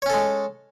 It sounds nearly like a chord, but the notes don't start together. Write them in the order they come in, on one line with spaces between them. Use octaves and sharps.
C#5 C#4 A4 G#3